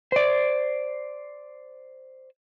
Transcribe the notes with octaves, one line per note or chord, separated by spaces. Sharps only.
C5 D5